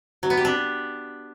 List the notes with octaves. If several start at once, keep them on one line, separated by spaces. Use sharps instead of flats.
F#3
B3
G4
D4